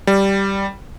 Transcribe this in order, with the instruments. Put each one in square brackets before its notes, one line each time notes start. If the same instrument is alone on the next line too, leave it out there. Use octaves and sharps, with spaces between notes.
[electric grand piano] G3